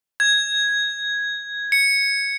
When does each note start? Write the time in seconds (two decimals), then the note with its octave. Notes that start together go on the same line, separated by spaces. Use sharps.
0.20 G#6
1.72 C#7